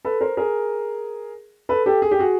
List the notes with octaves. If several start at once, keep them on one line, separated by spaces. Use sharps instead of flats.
A4 B4
A#4 C5
G#4 A#4
A4 B4
G4 A4
G#4
G4
F#4 G#4